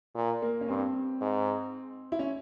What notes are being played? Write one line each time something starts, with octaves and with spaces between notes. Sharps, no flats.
A#2
A#3
C#4
G2 C4
G#2
E4
C#4